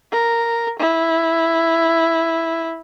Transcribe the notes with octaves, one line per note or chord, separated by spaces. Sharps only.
A#4
E4